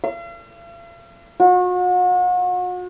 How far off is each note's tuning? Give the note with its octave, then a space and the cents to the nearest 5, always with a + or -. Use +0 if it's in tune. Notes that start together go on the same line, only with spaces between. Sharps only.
F5 -45
F#4 -40